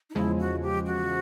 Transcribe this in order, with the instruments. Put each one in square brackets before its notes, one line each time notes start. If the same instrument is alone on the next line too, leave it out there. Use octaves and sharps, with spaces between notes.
[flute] D#4
[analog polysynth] E2 C#3 F3 G#3 [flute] E4
[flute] F#4
G4
F#4